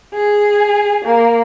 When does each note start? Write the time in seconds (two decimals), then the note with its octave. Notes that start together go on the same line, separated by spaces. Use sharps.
0.14 G#4
1.04 A#3